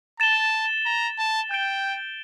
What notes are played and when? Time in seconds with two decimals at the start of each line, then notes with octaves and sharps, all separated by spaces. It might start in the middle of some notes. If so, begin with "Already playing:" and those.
0.20 A5 A6 E7 G7
0.86 A#5
1.18 A5
1.51 G5 G6 D7 G7